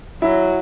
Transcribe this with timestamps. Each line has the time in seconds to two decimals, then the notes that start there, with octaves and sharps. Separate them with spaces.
0.22 F#3 E4